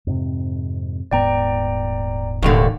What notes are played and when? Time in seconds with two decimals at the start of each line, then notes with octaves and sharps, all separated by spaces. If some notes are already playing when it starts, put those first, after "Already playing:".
0.07 F2 G#2 C3
1.11 D#1 G#2 B3 D5 G5 A#5
2.43 E1 D#2 A2 D3